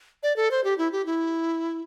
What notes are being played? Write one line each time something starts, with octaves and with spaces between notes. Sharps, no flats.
D5
A4
C5
G4
E4
G4
E4